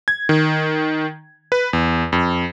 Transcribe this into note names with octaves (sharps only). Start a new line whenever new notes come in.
G#6
D#3
B4
E2
F2